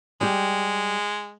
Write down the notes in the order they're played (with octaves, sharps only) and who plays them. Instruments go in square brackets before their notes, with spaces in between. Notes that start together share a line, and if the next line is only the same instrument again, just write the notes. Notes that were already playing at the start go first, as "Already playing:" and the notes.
[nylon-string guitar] G3 G4 [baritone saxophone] G#3